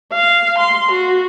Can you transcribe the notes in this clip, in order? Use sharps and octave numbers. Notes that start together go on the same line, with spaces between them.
F5
C6
F#4